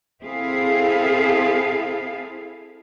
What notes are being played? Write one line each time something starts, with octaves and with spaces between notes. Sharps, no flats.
C4 E4 G#4 A4 F5